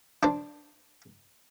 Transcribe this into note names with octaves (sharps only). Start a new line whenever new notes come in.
D4 C5 D5